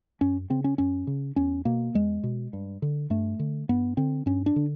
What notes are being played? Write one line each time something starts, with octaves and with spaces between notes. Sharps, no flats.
F#2 C#4
C#3 C4
C#4
F#2 C#4
C#3
E2 C#4
B2 A#3
E2 G#3
B2
G2
D3
G2 A3
D3
G2 B3
D3 C4
G2 C#4
D4
D3